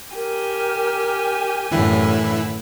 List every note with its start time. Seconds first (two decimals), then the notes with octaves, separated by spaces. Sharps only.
0.16 G4 A#4 G#5
1.71 F#2 A2 D3 E3 E4